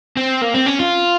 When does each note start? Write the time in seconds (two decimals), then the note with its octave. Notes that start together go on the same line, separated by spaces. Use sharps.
0.17 C4
0.42 A#3
0.55 C4
0.66 C#4
0.79 F4